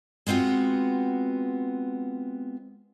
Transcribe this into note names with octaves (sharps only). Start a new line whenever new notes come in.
G#3 B3 C4 F4 F#4